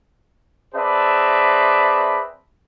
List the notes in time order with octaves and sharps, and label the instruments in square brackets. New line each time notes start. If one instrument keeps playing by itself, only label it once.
[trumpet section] C4 G#4 B4 D5 E5 A5